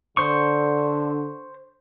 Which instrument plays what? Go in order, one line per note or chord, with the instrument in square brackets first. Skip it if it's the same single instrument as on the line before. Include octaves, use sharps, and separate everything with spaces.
[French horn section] D3 [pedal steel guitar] C5 C#6